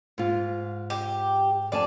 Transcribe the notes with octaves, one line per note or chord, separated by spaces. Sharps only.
G#2 F4
G4
F2 D5 G#5 A5